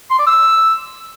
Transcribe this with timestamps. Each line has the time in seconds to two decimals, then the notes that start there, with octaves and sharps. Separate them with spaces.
0.10 C6
0.19 D5
0.27 E6